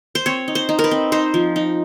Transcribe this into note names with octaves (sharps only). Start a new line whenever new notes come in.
C5
C4 C#5
D#4
C5
D#4
A#4
B4
C4
D#4 C5
F3
D#4